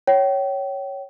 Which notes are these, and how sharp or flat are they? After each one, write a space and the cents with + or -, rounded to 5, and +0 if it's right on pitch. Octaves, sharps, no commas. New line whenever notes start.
C#5 +0 G5 -35